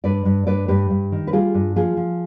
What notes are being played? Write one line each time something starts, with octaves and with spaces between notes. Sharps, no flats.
G2 B4 D5
G2
G2 B4 D5
G2 G4 B4
G2
D#3
B4
G3 F4 G#4
G2
F3 F4 G#4
F3